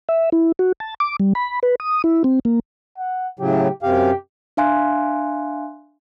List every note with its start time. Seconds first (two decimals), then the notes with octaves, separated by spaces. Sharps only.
0.09 E5
0.32 E4
0.59 F#4
0.80 A5
1.00 D6
1.20 G3
1.35 B5
1.63 B4
1.80 D#6
2.04 E4
2.24 C4
2.45 A#3
2.98 F#5
3.40 A2 C#3 F#3 G4
3.83 F#2 C3 G4 F5
4.57 D4 E5 F5 G#5 C6 F#6